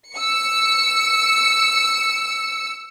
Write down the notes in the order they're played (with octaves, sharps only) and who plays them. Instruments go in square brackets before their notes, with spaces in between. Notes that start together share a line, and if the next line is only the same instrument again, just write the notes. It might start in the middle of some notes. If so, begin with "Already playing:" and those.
[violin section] E6 C#7